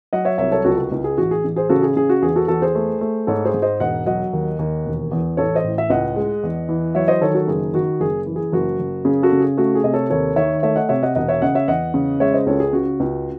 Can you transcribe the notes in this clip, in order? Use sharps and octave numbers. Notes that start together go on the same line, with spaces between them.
F#3 D#5 F#5
C#5 E5
C2 C#5 E5
A4 C#5
C#2 F#4 A4
F#4
C#2
G#4
A1 F#4
G#4
A1
G#4 C5
C#3 F#4 A4
G#4
C#3 G#4
F#4
E2 G#4
F#4 A4
E2 F#4 A4
G#4 C5
A3
A3
G#2 A4 C#5
G#4 C5
G#2
C5 D#5
E1 D#5 F#5
F#3 D#5 F#5
D#2
D#2
E1
E2
A1 A4 C#5
C5 D#5
A2
E5
C#2 D#5 F#5
G#3
E2
E3
F#3 C#5 E5
C5 D#5
D#3 A4 C#5
F#4 A4
F#1 G#4
D#3 F#4
F#1 G#4
E3
G#4
F#1 F#4
F#1
C#3 G#4
F#4 A4
C#3
G#4
A3 F#4
G#4
C3 D#5
A4 C#5
D#2 A4 C#5
D#3 C#5 E5
A3 C#5 E5
D#5 F#5
C3 C#5 E5
D#5 F#5
E1 D#5 F#5
C#5 E5
C#3 D#5 F#5
C#5 E5
E2 D#5 F#5
C#3
G#3 C#5 E5
C5 D#5
C#2 A4 C#5
G#4
C#3 F#4
C#2